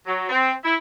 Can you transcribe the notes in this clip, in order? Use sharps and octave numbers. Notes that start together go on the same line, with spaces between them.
F#3
C4
E4